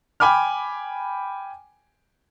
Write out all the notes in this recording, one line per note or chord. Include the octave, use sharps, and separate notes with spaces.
G5 G#5 B5 D6 F6